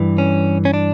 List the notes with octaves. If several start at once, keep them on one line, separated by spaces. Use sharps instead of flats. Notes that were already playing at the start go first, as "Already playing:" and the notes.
Already playing: G2 E3
C#4
C#4
D4